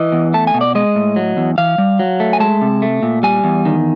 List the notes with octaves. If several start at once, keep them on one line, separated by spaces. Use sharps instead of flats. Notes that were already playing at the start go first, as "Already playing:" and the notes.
Already playing: E3 D#5
E2
A3 A5
G#5
B2
D5
G#3 D#5
A2
F#3
E2
E3 F5
G3
F#3
A3
G#5
G#3 A5
C3
A3
A#2
G3 G#5
E2
D#3